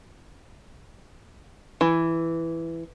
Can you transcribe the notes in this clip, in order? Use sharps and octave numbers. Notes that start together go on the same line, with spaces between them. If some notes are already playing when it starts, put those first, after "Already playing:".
E3